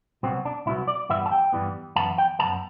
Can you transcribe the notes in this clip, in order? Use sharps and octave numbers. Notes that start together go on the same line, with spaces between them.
C2 B2 F#3 B3 C4
D4
C2 B2 F#3 B3 E4
D5
G2 E3 G3 B3 E5
A5
G5
G2 E3 G3 B3
F#2 E3 B3 A5
G5
F#2 E3 B3 A5